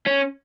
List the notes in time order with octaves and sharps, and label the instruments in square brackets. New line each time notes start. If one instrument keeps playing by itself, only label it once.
[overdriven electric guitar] C#4